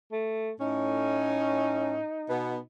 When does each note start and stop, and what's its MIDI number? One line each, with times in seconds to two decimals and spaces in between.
0.12 0.51 57
0.61 1.98 45
0.61 1.98 61
0.61 2.61 63
2.30 2.58 47
2.30 2.58 59